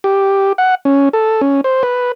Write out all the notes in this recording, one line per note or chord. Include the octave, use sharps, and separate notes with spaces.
G4
F#5
C#4
A4
C#4
C5
B4